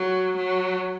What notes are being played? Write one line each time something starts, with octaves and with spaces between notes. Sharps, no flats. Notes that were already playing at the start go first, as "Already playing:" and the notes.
Already playing: F#3
F#3